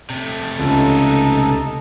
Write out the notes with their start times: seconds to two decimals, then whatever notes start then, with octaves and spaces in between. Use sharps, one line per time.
0.10 C3 A3
0.59 C#2 D#4 A4